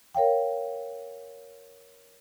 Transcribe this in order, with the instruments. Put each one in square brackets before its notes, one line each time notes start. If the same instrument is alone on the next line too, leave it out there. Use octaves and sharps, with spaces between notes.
[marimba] A#4 C#5 F5 G5